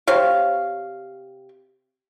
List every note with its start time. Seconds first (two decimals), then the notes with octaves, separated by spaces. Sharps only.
0.07 C3 C#5 F5